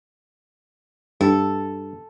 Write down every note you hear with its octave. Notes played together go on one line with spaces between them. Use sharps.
G2 A4